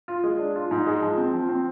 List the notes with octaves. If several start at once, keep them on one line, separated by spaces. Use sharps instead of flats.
F4
G#3
D4
F4
G#2
G#3
F3
C4
F3
C4